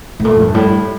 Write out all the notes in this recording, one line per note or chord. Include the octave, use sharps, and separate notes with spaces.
A2
A#2 A3
F2
G2
A2 G3